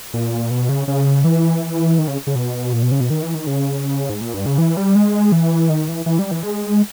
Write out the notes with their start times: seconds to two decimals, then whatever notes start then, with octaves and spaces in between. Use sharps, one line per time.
0.14 A#2
0.51 B2
0.69 C#3
0.88 C#3
1.24 E3
1.99 D#3
2.08 C#3
2.27 C#3
2.35 B2
2.73 A#2
2.83 B2
2.92 C#3
3.01 B2
3.10 D#3
3.22 E3
3.35 D#3
3.47 C#3
4.10 G#2
4.21 A#2
4.34 G2
4.46 C#3
4.58 E3
4.77 G3
4.95 G#3
5.32 E3
5.69 D#3
5.88 E3
6.06 E3
6.19 G3
6.31 E3
6.43 G#3